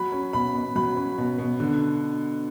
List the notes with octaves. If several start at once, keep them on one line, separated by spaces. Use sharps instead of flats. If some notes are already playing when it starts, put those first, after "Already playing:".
Already playing: F#3 B5
C#4
B2 B5
B2
F#3 B5
C#4
B2
B2
D3